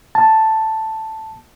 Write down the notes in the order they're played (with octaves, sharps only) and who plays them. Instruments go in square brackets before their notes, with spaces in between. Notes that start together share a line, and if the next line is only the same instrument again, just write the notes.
[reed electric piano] A5